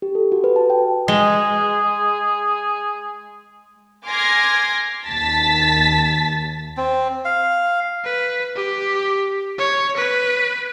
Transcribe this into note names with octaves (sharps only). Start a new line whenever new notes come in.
G4
A4
F#4
B4
A5
G5
G#3 G#4
G#5 C6 D6 F6 G#6 A#6
D#2 A5 A6 B6
C4
F5
B4
G4
C#5
B4